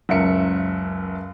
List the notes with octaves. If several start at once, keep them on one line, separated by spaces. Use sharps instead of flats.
F#1 C#2 A#4 E5 C#7